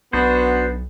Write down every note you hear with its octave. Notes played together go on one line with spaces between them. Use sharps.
B1 B3 D4 F#4 C5